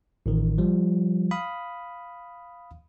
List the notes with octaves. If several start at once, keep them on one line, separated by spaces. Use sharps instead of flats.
A1 D#3
F3 G3
F5 B5 D#6